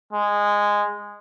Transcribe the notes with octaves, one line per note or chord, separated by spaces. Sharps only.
G#3